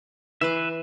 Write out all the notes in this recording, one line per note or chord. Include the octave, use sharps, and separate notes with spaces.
E3 B4 E5 C6 D6